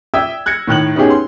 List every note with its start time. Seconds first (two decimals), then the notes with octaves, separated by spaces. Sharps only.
0.14 D5 E5 G5 D#6 E6 G#6
0.46 F#6 G#6 A#6 C#7
0.67 A2 D#3 F#6 F#7
0.95 B3 C#4 D#4 E4 G4 G#4
1.10 C6